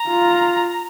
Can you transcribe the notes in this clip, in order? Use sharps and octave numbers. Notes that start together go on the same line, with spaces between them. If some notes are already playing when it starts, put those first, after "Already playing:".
Already playing: A#5
F4